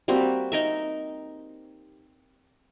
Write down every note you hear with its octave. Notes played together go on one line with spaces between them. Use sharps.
G3 A#3 C4 F#4
D#4 A#4 E5